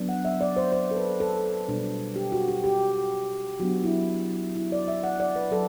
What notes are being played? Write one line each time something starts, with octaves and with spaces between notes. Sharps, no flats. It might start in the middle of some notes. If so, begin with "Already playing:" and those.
Already playing: F#3 B3 D4
F#5
E5
D5
C5
C5
A4
B4
A4
B2 G3 D4
G4
F#4
G4
G4
F#3 B3 D4 F#4
E4
E4
D5
E5
F#5
D5
B4
F#3 A4